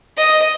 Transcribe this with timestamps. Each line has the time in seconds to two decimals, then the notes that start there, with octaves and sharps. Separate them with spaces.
0.18 D#5